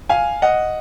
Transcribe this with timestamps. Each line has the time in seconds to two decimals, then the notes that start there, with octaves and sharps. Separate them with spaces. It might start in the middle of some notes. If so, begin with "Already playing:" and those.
0.09 F5 G#5
0.42 D#5 F#5